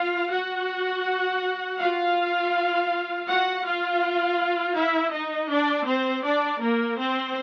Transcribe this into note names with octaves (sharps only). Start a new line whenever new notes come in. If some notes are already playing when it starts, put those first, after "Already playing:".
Already playing: F4 F5
F#4 F#5
F4 F5
F#4 F#5
F4 F5
E4 E5
D#4 D#5
D4 D5
C4 C5
D4 D5
A#3 A#4
C4 C5